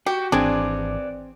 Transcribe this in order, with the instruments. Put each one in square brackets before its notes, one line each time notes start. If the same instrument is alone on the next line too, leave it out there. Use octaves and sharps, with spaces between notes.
[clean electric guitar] F#4 [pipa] G4
[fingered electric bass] G#1 E3 [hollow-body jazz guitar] C4 G#4 [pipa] D4 [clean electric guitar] B4 D5